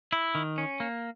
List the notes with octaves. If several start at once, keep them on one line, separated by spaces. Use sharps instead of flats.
E4
D#3
C#4
A#3